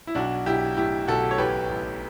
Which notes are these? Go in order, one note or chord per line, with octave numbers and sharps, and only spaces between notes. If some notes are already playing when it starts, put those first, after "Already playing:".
E4
B1 D4 F#4
B1 E4 G4
A2 E4 G4
B1 F#4 A4
C#5
A1 G4 B4
A1